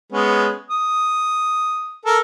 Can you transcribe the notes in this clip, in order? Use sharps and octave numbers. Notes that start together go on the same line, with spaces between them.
G#3 B3 C#4
D#6
A4 A#4